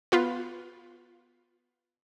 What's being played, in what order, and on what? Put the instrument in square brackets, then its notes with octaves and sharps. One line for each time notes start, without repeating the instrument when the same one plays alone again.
[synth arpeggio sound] B3 F4 B4